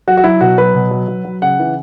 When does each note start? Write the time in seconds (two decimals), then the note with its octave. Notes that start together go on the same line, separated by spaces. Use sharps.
0.07 F#3 F#4
0.17 F#4
0.24 F#3 E4
0.41 B2 F#4
0.58 F#3 B4
0.75 B2
0.91 F#3
1.08 F#3
1.25 F#3
1.42 C#3 F#5
1.59 E3